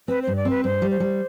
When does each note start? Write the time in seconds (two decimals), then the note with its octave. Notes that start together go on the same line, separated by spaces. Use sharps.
0.08 C4 B4
0.22 C5
0.27 G2
0.36 D5
0.45 C4 B4
0.64 G2 C5
0.82 G3
0.91 C5
1.00 G3